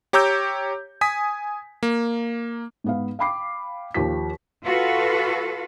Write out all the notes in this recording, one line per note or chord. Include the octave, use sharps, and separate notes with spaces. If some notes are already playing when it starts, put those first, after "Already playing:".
G4 C#5 A#5 D6 E6 G6
G#5 D#6 B6
A#3
G#2 B3 F5
F5 G5 B5 D6 C7
D#2 F3 G4 B6
F4 F#4 A4 B4 F5